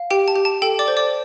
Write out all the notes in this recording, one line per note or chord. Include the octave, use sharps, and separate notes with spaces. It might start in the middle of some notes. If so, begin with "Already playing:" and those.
Already playing: F5
G4 G5
A5
G4
A5
A4 G5
D5 D6
C5
D5 D6